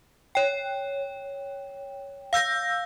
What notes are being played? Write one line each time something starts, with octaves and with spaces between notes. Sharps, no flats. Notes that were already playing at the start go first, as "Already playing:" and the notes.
C#5 G5
F5 E6 G6 A#6